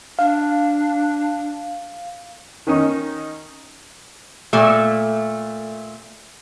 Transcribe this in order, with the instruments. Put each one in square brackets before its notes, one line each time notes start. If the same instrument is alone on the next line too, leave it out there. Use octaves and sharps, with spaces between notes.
[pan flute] D4 [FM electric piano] F5
[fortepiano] D#3 C#4 D#4
[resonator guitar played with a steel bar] A#2 A3